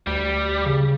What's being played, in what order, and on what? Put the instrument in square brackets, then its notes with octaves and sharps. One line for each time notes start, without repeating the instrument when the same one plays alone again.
[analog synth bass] D2 [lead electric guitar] G3
[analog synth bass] C#3